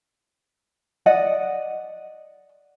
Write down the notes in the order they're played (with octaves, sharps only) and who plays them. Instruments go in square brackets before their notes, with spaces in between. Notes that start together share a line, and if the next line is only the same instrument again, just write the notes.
[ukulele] D5 D#5 F#5